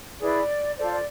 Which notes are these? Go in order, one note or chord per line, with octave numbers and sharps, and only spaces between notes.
E4 G#4 B4 D5
F4 A4 C5 D5
D5